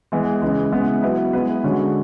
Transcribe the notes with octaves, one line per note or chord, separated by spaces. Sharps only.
E3 G#3 B3
C#3 E3 G#3
C#3 G#3 B3 E4
F#3 B3 E4 B4
G#3 B3 E4 G#4 B4
D3 G#3 C#4 F#4